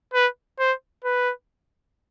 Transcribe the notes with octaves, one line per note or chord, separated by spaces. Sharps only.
B4
C5
B4